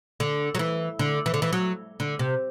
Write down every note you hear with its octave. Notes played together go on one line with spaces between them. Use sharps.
D3
F#3
E3
D3
E3
D3
E3
F#3
D3
C3